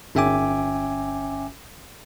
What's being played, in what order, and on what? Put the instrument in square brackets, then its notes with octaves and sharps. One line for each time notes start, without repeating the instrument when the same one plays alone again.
[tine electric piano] G1 C#4 E5 G5 G#5 D6